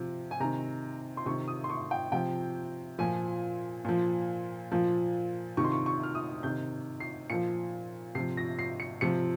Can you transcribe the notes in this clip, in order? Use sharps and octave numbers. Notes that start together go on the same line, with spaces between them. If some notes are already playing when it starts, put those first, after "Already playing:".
Already playing: C3 F3
G#5
C3 D#3 A#5
C6
C3 D#3 C#6
D#6
C6
C#6
G5
C3 F3 G5
A#2 F3 G#5
A#2 F3
A#2 F3
C3 D#3 C#6
C6
C#6
C#6
F6
D#6
C3 D#3 G6
C7
A#2 F3 C#7
C3 F3 C7
A#6
C7
C#7
C3 F3 C#7